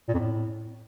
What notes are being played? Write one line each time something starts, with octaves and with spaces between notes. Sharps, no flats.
A#2
F2
A2